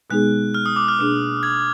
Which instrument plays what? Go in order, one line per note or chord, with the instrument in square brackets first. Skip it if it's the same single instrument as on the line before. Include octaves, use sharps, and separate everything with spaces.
[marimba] B2 G#3 B3 D#4 G#4 [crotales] F#6
[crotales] F6
D#6
D6
F6
[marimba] B2 A#3 D4 G#4
[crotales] G#6